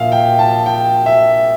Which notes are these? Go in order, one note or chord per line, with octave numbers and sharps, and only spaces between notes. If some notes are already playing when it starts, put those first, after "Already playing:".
Already playing: A#1 A#2 E5 F5
G5
A5
G5
E5